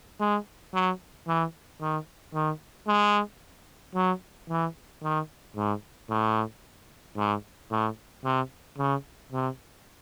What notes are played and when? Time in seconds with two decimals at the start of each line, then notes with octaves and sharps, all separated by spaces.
0.20 G#3
0.74 F#3
1.28 E3
1.81 D#3
2.35 D#3
2.88 G#3
3.95 F#3
4.50 E3
5.03 D#3
5.57 G#2
6.10 A2
7.17 G#2
7.71 A2
8.25 C3
8.78 C#3
9.32 C3